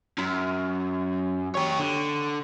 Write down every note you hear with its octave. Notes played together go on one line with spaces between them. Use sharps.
F#2
G4 C#5
D3